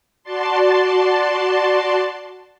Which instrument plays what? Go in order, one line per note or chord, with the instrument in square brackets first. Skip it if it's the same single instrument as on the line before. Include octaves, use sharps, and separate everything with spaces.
[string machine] F#4 D5 A5 C6